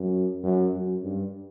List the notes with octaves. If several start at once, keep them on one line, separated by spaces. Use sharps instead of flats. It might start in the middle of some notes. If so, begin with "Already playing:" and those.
Already playing: F#2
F#2
F#2
G2